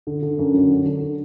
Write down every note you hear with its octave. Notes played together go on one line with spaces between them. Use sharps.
D3
D3
F#2
F#3
D3
D3